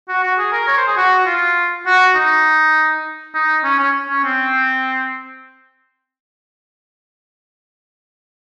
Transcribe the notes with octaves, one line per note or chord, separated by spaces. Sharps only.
F#4
F#4
G#4
A#4
C#5
C5
G#4
F#4
F4
F#4
D#4
D#4
C#4
C#4
C#4
C4